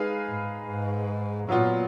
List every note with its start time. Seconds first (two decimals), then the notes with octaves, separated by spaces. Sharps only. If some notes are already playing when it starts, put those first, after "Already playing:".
Already playing: G#3 D#4 G#4 B4 F5
0.26 G#2
0.66 G#2
1.49 A#2 F#3 B3 F4